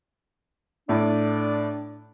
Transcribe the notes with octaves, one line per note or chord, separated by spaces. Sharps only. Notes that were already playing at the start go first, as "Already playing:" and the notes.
A2 D4 D5